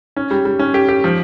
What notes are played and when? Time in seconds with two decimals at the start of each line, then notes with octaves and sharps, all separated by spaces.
0.17 C#4
0.31 G3
0.45 G3
0.59 C#4
0.74 G4
0.89 G4
1.04 F3